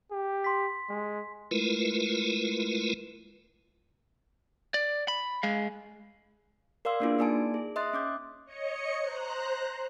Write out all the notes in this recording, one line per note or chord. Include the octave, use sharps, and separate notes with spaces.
G4
C6 B6
G#3
G#3 A3 E4 F4 A#4 B4
D5
B5
G#3 F5
A#4 D5 F5 C6 E6
A#3 B3 D4 E4 F4 G#4
A#3 D#4 D5 G#5 A5 D7
G#4
D#5 E5 C6 D#6 F#6 A6
C#4 D6 G6
C#5 D#5 C#7
C5 A#5 F#6